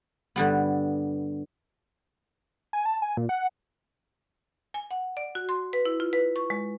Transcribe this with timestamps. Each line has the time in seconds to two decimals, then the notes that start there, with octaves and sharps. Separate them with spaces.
0.36 G2 D3 G3 B3
2.73 G#5
2.86 A5
3.02 G#5
3.17 A#2
3.29 F#5
4.74 G#5
4.91 F#5
5.17 D5
5.35 F#4
5.49 C6
5.73 B4
5.85 E4
6.00 F4
6.13 B4
6.36 C#6
6.50 G#3